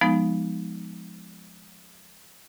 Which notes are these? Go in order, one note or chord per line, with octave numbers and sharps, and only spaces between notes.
F3 G#3 B3 D#4